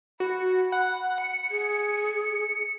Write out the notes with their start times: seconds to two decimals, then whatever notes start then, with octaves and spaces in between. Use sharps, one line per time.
0.20 F#4 B5
0.72 F#5
1.18 C#7
1.51 G#4